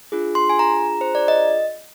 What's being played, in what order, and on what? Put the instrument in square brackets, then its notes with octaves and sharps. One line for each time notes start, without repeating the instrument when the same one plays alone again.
[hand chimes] D4 F4 G#4
C6
G#5
A#5
C5
D5
D#5